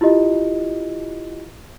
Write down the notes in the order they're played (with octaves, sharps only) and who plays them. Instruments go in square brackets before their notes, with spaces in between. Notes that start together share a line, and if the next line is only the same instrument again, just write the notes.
[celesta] E4 F4 G4 D#5